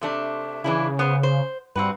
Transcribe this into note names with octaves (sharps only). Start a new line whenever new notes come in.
C3 A3 D4
C#3 E3 D4 E4
B3 C5
C5
G2 C4 F#4 B4